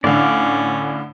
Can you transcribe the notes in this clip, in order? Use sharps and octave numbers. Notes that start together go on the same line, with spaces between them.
A2 D3 C#4 D5 F5